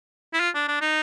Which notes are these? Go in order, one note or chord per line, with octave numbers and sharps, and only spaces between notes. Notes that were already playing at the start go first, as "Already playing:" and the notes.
E4
F4
D4
D4
D#4